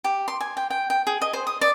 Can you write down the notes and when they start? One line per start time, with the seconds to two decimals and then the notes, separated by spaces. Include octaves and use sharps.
0.04 G4
0.28 C6
0.41 G#5
0.57 G5
0.70 G5
0.90 G5
1.07 G#4
1.22 D#5
1.33 C5
1.47 D#6
1.61 D5